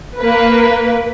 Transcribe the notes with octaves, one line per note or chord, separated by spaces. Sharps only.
A#3 B4